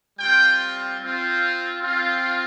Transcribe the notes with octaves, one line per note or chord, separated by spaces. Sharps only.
G3 C4 F4 G5
C4 F4
C4 F4